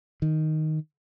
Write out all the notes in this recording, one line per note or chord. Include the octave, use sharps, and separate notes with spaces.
D#3